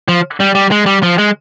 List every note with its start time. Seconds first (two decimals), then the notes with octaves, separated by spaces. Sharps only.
0.08 F3
0.40 G3
0.55 G3
0.71 G#3
0.86 G3
1.03 F3
1.18 G#3